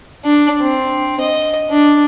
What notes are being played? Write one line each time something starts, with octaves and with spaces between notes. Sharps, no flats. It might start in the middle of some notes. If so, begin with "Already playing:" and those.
D4
C4
D#5
D4